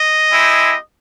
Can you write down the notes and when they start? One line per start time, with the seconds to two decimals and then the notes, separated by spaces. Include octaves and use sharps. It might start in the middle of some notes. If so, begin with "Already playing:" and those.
Already playing: D#5
0.32 G#3 C4 E4 G4